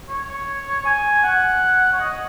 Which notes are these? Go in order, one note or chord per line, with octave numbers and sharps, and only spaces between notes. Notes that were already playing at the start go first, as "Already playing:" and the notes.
C#5
G#5
F#5
C#5
D#5